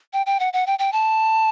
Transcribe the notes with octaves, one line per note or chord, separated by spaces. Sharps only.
G5
G5
F#5
F#5
G5
G5
A5